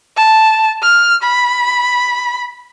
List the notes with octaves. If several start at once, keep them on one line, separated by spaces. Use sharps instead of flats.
A5
F6
B5